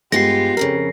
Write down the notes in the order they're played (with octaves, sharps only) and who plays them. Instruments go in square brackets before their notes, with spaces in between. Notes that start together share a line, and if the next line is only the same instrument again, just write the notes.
[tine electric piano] G2 [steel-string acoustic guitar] G#3 B3 F4 [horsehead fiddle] G4 [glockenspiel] A#6 C7
[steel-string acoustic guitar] F2 A2 C#3 [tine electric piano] A#4